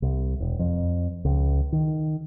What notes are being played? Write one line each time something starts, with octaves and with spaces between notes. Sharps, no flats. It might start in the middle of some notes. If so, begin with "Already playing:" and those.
C2
E1
F2
C#2
D#3